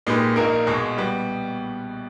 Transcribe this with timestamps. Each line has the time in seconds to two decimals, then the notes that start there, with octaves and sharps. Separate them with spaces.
0.07 A#2 G#3 D#4 G4 B4
0.36 A#1 A#2 A#3 D#4 A#4
0.67 B1 B2 G#3
0.98 G3 B3